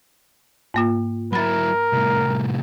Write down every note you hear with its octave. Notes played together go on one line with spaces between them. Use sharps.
G#2 A#3 F4
F#3 E4 A#4 B5 A6
C2 A2